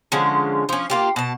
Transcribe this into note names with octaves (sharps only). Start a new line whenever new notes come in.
D3 F3 G#3 C#4
F3 C#4
A#3 F4 G4
B2 A5